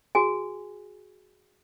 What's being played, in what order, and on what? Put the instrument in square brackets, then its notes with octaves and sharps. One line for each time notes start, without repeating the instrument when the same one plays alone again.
[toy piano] F#4 G#4 G#5